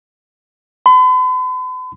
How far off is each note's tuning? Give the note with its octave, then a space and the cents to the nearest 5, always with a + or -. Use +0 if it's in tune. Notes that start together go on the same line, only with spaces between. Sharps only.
B5 +45